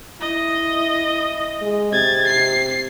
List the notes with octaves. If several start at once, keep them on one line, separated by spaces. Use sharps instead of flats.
E4 D#5
G#3
C3 G#6 A6
C7